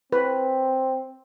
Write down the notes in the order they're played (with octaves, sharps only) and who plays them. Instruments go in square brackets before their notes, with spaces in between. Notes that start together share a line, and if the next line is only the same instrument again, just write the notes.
[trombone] C4 [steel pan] B4